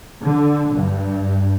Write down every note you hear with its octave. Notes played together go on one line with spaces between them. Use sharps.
D3
G2